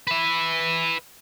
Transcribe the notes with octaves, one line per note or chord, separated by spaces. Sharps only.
B4 E5